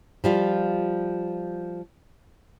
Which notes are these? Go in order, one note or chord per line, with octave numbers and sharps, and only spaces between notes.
F3 G3 F4